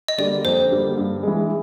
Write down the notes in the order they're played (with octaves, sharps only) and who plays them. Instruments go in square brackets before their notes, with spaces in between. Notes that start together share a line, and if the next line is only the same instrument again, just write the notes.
[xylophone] D#5
[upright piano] D3 G3 A#3 [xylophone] D5
[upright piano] F2 [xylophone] C5
[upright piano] D3 G3 A#3
G2
E3 G#3